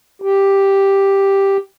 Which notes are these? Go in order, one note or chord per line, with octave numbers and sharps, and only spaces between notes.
G4